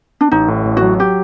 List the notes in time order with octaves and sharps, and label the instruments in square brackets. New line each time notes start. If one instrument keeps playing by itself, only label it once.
[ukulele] D4
[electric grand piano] A1 [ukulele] D#4
[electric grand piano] A2
A1
[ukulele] F#4
[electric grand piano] F#3
[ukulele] G4